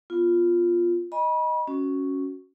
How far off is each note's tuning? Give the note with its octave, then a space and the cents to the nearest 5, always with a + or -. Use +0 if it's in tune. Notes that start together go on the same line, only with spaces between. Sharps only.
B3 +0 F4 +0
D#5 +0 G#5 +0 B5 -35
C#4 +0 F#4 +0